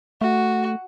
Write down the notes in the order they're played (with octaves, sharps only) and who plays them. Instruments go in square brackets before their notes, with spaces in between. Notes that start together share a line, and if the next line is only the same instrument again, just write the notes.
[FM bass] A3 [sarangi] F#4